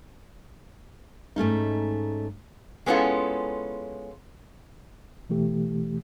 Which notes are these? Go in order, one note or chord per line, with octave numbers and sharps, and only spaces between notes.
G#2 A3 C#4 D#4
G#3 B3 C#4 E4 F4 A4
B2 E3 A3 G4